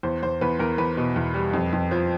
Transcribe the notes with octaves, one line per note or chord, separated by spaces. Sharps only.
E2 C5
E2 C5
E2 B4
E2 A#4
E2 B4
B2
E2
G3
F2
F2
F3